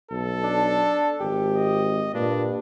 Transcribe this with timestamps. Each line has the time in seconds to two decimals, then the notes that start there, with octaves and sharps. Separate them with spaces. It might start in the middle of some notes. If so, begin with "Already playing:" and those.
0.11 B1 A4
0.44 D4
1.20 G#1 G4
1.55 D#5
2.14 G2 A#2 D4